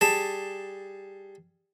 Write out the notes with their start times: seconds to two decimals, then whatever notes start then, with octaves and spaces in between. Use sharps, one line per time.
0.01 G3 G#4 A5